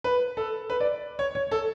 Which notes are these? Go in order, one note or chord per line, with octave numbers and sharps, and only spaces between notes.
B4
A4
B4
D5
C#5
C#5
A4